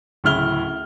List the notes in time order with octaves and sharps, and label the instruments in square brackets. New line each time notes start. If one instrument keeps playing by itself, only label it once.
[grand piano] D1 C#3 E4 F6 G7